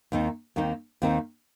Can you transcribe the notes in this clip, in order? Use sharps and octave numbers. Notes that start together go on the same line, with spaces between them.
D#2 D#3 C4 D#4
D#2 D#3 C4 D#4
D#2 D#3 C4 D#4